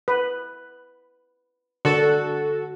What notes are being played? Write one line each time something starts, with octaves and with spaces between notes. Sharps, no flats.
B4
D3 F#4 A4